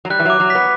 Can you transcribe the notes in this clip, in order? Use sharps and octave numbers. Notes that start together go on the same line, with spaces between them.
F#3
G3 F#6
E3
F#3 D6
F#3
B3 B6